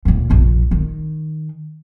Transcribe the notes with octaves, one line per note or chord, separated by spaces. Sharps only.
D2 A#2
F1 A#1
D#3